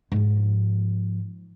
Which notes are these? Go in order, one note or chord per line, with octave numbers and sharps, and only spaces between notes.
G#2 F3